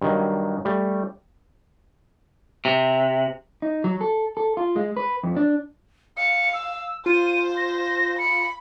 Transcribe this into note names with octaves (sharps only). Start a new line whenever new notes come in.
G2 D#3 F#3
G3 A3
C3
D#4
F#3
A4
A4
F4
G#3
B4
F2
D4
F5 C#7
E6
F4 C5 D#7
A#6
B5 C#7